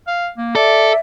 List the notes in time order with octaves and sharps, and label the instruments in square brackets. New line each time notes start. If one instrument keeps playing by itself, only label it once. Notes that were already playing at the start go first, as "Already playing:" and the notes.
[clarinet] F5
A#3
[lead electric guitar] A4 [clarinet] D5 [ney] E5